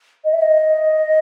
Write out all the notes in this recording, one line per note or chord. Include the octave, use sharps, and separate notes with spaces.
D#5
E5
D#5